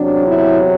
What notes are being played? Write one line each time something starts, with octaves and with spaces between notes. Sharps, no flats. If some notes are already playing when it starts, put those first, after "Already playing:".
Already playing: E2 C3 F#3 D4
E4